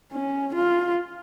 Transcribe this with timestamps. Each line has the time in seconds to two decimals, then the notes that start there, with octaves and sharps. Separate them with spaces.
0.12 C#4
0.54 F4